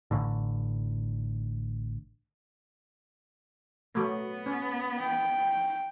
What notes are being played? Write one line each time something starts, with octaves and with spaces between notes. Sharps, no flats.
A1 A2 D3
F#3 A3 B3
C#4
G5